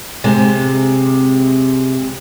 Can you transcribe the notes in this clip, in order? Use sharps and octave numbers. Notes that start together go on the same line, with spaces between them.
C3 G#3